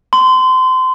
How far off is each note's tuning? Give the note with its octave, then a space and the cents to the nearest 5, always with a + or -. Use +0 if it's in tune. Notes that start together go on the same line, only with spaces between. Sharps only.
C6 -25